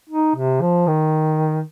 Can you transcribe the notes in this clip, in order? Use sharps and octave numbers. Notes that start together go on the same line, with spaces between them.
D#4
C3
F3
D#3